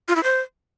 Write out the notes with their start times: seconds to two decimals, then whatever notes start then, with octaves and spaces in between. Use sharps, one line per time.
0.08 F4
0.16 E4
0.23 C5